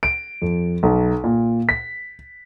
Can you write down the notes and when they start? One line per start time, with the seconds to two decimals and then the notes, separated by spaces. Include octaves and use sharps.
0.03 D7
0.42 F2
0.83 B1
1.24 A#2
1.69 B6